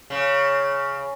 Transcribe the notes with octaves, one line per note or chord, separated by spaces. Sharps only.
C#3